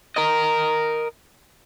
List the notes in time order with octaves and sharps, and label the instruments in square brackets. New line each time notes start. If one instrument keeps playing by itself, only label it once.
[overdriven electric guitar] A#4 D#5